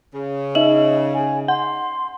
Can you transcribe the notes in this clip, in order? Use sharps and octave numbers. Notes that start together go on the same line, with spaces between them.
C#3
D#4 D#5 E5 F#7
G#5
F#5 C6